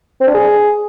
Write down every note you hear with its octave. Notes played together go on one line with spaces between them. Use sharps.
C4
D4
G#4